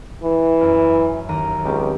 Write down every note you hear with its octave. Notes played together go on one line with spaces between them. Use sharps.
E3
F#2
D#2 A#5 D#7
C#2 C4 G4